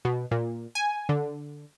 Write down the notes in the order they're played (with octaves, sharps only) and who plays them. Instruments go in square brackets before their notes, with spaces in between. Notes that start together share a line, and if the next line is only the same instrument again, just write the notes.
[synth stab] B2
A#2
G#5
D3